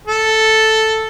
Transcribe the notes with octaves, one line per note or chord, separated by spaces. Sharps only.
A4